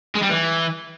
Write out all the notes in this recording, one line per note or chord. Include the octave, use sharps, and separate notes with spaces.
G#3
G3
E3